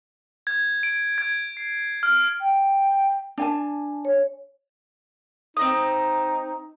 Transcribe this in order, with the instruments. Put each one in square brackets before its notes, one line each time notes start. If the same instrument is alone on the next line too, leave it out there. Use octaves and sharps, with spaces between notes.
[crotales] G#6
D7
G#6
C7
F6
[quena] G5
[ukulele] D4 G#5 A5
[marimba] C#5
[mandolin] C4 D#5 D#6 [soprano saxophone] D#4